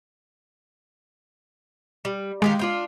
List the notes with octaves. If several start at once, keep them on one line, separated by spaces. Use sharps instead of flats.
G3
D#3 G#3 G4 F5
D4 F4 G5